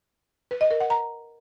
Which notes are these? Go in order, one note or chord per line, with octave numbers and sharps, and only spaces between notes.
B4
D#5
A#4
F#5
A#5